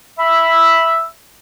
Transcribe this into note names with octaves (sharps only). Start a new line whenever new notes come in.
E5 B5 E6